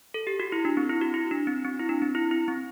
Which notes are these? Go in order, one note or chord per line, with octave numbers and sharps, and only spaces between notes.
A4
G4
F#4
E4
D4
C4
E4
F#4
E4
D4
C4
C4
E4
D4
C4
E4
E4
C4